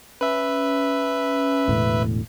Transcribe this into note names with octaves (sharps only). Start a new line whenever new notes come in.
C#4 B4 E5
E1 A2 D3